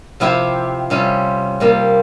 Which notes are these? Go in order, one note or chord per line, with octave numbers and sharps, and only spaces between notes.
C3 F3 C4 E4 G4
C3 G3 C#4 F4
C3 G3 A#3 F4